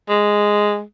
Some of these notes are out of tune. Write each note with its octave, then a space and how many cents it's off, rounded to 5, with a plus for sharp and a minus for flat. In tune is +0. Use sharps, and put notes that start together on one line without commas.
G#3 -5